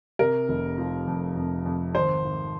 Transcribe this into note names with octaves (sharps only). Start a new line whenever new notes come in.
C3 A#4
F1
F3
F2
F2
F2
G#1 C5
G#1